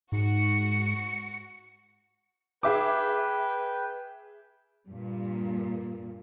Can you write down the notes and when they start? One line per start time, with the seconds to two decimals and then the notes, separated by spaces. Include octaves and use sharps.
0.12 G#2 F#4 C#7
2.63 G#4 B4 E5 G5 D6
4.90 G2 A#2